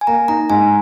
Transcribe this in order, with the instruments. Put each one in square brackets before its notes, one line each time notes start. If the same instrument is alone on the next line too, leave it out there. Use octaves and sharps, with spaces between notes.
[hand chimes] G#5
[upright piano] A#3 [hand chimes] A#5
[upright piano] D#4 [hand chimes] A#5
[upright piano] G#2 [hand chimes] G#5